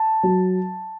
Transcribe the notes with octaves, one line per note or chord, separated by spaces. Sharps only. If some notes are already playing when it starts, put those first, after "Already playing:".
Already playing: A5
F#3